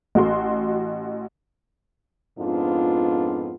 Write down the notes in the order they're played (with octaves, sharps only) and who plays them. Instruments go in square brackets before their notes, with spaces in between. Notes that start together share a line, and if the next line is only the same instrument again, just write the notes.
[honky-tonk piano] A1 F#4 C6
[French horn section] F2 G#2 B3 D4 F4